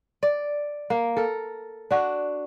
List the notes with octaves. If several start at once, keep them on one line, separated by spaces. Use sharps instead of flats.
D5
A#3
A4 A#4
D4 F#4